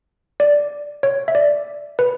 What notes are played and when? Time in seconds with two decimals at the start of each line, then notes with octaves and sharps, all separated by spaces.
0.40 D5
1.03 C#5
1.28 E5
1.35 D5
1.99 B4